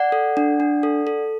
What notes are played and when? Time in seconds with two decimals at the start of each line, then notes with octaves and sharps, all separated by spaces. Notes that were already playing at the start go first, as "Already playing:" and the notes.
Already playing: D5 F#5
0.12 A4
0.37 D4
0.60 D4
0.83 A4
1.07 A4